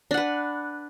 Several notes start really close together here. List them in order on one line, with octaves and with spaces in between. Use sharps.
D4 F#5 B4